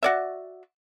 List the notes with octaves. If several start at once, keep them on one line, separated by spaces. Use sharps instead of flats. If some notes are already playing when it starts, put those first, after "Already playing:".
F#4 D5 E5